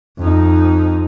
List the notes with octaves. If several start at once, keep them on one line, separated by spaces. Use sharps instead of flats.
F2 D#4